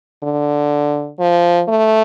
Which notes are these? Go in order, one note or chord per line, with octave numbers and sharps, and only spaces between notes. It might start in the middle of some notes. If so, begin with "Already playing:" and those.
D3
F3
A3